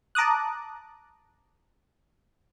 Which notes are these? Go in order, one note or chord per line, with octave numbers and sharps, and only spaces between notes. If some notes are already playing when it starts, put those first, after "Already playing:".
A5 A#5 D6 D#6 F#6